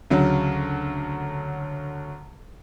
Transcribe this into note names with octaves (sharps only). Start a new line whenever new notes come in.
D2 C#3 F#3